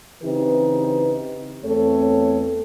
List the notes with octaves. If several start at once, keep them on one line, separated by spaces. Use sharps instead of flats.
C#3 E3 C4 D#4 G4 B4
E2 A3 C4 A4 C#5